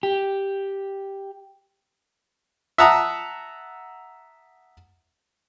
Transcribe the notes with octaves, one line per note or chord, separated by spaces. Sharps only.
G4
E5 F#5 A5 A#5 D#6